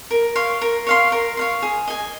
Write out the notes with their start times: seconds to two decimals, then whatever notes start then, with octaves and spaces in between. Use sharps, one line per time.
0.11 A#4
0.35 C#5 F5 C6
0.61 A#4
0.87 C#5 F5 C6
1.12 A#4
1.37 C#5 F5 C6
1.62 G#4
1.88 D#5 G#5